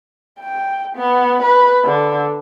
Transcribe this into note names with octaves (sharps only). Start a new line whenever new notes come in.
G5
B3
B4
D3